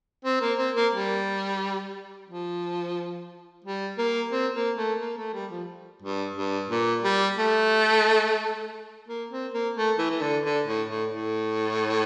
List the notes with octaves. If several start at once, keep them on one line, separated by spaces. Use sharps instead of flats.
C4
A#3
C4
A#3
G3
F3
G3
A#3
C4
A#3
A3
A#3
A3
G3
F3
G2
G2
A#2
G3
A3
A#3
C4
A#3
A3
E3
E3
D3
D3
A2
A2
A2